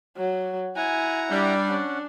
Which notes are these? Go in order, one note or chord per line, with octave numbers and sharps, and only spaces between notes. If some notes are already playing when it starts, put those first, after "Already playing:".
F#3
E4 F#5 G#5 A#5
G3 D4
C#4 F#5